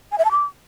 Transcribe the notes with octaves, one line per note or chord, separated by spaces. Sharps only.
G#5
E5
A5
D6